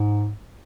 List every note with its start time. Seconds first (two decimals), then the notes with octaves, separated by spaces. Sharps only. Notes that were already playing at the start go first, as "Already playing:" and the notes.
Already playing: G#2